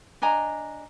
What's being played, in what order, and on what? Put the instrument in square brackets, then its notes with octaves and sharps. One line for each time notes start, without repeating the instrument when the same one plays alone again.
[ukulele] D4 D#5 G#5 A#5